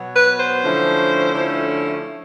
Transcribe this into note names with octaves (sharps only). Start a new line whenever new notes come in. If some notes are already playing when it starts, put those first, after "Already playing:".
Already playing: B2 F#3 B3
B4
C5
D3 F3 A3 C#4 E4
D3 F3 A3 C#4 E4